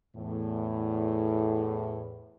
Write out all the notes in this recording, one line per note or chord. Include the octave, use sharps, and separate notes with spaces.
E2 A2